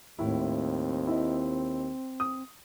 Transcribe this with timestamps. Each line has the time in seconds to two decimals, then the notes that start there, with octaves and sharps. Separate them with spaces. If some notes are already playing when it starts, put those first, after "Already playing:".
0.19 D#2 A2 C4 E4
1.07 E4 D#5
2.20 D#6